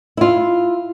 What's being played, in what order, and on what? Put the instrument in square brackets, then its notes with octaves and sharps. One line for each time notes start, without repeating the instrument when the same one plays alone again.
[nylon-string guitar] E4 F4